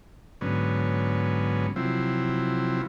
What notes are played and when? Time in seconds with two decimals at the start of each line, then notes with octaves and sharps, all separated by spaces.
0.41 G#2 D3 F#3 B3 C#4
1.76 C3 F3 F#3 C4 E4